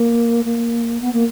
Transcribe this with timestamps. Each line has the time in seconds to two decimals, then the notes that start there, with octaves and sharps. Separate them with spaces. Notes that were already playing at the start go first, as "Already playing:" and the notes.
Already playing: A#3
0.44 A#3
1.01 B3
1.12 A#3